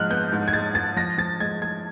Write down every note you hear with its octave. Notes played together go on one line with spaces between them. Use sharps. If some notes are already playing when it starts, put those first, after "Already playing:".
Already playing: G#2 F3 G#3 F6 F#6
B3 G6
G#2
G#6
G#3 A6
G#3 A6
F3 A#6
F3 A6
G#3 G#6
G#3 G#6